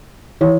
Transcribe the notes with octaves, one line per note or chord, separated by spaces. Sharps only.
E3 C#5